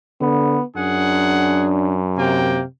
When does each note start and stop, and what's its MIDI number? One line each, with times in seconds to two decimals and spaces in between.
0.21 0.59 50
0.21 0.64 59
0.76 2.62 42
0.76 2.01 62
0.76 1.69 68
0.76 1.69 78
2.18 2.64 48
2.18 2.63 58
2.18 2.63 79